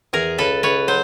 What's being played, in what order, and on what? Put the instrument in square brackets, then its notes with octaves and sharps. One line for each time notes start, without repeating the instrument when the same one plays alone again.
[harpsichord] E2 [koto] G#4 A#4
[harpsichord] C#2 [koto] A4 B4
[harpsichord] C#2 [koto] B4 C#5
[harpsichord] F#3 [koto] C5